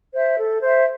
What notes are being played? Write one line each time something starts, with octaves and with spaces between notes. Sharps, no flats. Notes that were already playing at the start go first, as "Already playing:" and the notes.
C5 E5
A4
C5 E5